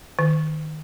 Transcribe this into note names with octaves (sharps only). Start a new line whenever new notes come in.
D#3